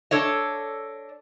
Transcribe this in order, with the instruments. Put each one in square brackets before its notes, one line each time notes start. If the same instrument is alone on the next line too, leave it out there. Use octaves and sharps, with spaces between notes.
[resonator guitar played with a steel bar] D4 A4 C#5 D#5